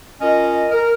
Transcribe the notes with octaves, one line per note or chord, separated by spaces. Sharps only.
C#4 F4 A#4 D#5
A#4